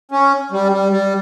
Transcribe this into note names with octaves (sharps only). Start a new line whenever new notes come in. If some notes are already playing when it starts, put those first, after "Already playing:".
C#4
G3
G3
G3